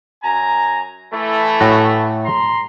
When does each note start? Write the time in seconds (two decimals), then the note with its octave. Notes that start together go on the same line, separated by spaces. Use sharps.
0.23 F#2 G#5 A#5
1.13 E3 A3
1.61 A2 F#4
2.24 A#5 C6